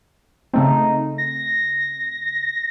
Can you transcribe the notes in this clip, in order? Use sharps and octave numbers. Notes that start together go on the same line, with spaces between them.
C#3 A3 C4 D#4
A#6